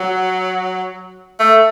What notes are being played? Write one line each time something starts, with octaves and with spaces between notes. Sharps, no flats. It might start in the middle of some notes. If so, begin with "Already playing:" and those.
Already playing: F#3
A3